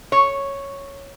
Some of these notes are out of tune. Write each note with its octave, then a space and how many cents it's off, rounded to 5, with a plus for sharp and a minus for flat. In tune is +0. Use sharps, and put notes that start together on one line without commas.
C#5 -5